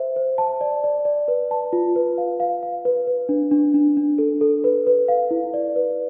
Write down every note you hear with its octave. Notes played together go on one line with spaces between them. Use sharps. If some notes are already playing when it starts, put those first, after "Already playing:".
Already playing: C5 E5
C5
A5
D5
D5
D5
B4
A5
F4
B4
F5
F5
F5
B4
B4
D4
D4
D4
D4
A4
A4
B4
B4
F5
E4
D5
B4